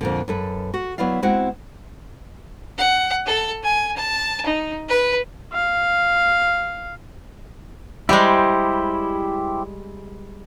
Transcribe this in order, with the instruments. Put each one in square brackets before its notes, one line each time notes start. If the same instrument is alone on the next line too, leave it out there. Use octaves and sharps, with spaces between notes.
[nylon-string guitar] F2 A#2 D3
F#2 A4 B4
F#4
F#3 B3 E4 D5 F5
G#3 C4 E4 F#4 F#5
[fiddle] F#5
A4
G#5
A5
D#4
B4
[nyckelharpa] F5
[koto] G3 G#3 [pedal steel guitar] E4 G4 C5